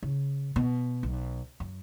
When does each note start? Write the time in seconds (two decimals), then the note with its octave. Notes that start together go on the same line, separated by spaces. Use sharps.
0.03 C#3
0.56 B2
1.03 B1
1.60 F#2